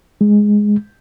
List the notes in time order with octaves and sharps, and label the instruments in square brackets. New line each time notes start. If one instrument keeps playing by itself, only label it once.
[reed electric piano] G#3